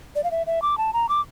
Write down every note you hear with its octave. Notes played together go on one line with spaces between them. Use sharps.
D5
F5
E5
E5
D6
A5
A#5
D6